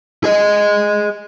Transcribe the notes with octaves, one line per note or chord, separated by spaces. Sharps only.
G#4 D#5